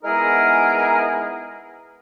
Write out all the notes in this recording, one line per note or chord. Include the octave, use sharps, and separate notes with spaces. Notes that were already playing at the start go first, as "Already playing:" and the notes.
G#3 B3 D#4 E4 G#4 A#4